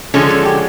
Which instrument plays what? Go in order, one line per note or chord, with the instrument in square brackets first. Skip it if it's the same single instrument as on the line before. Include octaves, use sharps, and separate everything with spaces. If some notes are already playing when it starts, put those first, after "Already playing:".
[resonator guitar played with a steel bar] D3 F3 G#3 C#4 A4
A4
G4